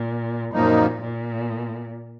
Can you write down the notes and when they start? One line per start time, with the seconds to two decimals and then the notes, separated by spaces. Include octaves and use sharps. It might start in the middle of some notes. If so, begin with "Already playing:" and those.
Already playing: A#2
0.54 F#2 A#2 F3 A#3 D#4
1.01 A#2